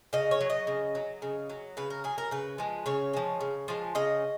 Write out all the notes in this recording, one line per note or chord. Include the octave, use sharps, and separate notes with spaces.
C#3 D#5
C#5
F#3
D#5
C#3
F#3
C#3
F#3
C#3 B4
A#4
F#3 G#4
A#4
C#3 B4
F3 G#3
C#3 C#5
F3 G#3
C#3
F3 G#3
C#3 D#5